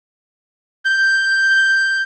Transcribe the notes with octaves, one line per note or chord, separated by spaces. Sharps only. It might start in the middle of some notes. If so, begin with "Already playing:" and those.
G6